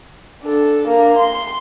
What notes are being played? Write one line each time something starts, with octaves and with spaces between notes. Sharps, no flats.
D4 A4
A#3 D4
C6